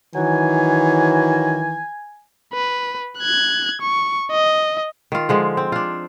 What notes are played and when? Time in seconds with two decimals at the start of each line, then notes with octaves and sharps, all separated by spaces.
0.15 D#3 E3 F#3 G#5
2.54 B4
3.19 F#6 G#6
3.82 C#6
4.31 D#5
5.12 D#3 F4
5.29 D3 F3 G#3
5.57 C4
5.72 D4 F4